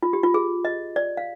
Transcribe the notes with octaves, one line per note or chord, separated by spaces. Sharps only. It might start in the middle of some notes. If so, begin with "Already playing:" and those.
F4
G4
F4
G#4
D#5
D5
F5